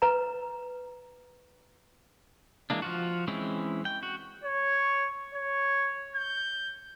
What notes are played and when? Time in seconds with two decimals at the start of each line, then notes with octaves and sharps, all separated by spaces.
0.02 B4 A#5
2.70 E3 G#3 A#3 D4
2.82 F3 F4 F#4
3.28 E3 G#3 C4 C#4 E4
3.85 G5
4.03 F#4
4.44 C#5
5.34 C#5
6.16 G6